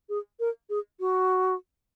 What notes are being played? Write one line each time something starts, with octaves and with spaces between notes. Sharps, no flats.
G#4
A#4
G#4
F#4